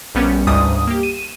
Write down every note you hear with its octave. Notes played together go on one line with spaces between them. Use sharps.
A#1 G3 B3 C#4
G1 D2 G#2 G3 D#6
A#3 G4
D#7 E7